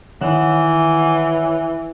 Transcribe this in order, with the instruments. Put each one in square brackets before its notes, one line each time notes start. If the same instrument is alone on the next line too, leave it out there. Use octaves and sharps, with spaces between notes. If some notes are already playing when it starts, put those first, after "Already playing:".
[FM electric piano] D#3 C#5 F#5 [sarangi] E3